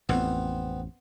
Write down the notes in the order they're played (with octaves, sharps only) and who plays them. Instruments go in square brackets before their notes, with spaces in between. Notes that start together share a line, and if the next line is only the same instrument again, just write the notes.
[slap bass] A1 F2 [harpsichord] B3 C4